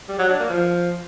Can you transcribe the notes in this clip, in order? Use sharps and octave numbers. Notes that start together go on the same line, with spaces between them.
G3
F#3
D4
A#3
F3